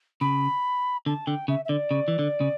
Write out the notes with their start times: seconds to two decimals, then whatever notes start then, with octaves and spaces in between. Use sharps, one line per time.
0.21 C#3 B5
1.06 D3 A5
1.27 D3 G5
1.48 C#3 E5
1.65 E5
1.69 D3 D5
1.91 C#3
2.08 E3
2.19 D3
2.40 C#3